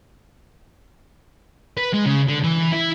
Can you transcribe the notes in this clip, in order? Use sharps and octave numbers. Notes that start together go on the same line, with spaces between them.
B4
G#3
C#3
D3
E3
E4